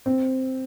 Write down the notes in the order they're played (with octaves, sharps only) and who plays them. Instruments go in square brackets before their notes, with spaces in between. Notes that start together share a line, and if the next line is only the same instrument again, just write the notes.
[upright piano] C4